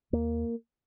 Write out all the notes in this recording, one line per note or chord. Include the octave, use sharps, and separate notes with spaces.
D#2 A#3